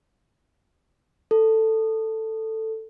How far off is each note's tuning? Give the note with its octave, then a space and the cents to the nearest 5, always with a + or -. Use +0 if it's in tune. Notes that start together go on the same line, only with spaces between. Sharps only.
A4 +10